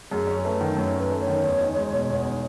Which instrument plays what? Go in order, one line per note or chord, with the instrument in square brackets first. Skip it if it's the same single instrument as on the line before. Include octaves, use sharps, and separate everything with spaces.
[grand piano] F#2 [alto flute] G#4
[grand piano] C#4
[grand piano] A3 [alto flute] B4
[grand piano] D#3
[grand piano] F#2 [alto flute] C#5
[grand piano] C#4
[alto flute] B4
[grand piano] A3
[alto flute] C#5
[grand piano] D#3
E2
D#4
G#3
B2
E2
D#4